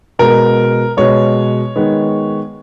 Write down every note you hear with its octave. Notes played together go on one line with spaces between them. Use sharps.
B2 G#3 B3 A#4
B2 G#3 B3 C#5
D#3 G#3 B3